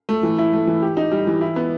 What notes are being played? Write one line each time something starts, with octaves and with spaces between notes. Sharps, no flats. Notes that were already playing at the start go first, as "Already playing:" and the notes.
A3
E3
E4
A3
E3
G4
D#4
G3
E3
E4
B3